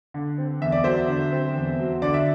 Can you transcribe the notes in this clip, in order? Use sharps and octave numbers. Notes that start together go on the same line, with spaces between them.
D3
C4
E2 E5
D5
F#3 C5 E5
D3
C4
E2
F#3
D3 D5
E5